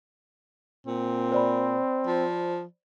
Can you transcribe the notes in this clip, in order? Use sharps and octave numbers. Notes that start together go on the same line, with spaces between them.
A#2 C4
C5 D5 B5
F3